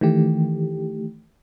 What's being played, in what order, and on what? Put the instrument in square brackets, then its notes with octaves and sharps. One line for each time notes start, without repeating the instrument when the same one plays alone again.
[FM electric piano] D#3 E3 A3 G4